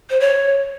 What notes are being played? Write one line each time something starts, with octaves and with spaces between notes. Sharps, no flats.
C5
C#5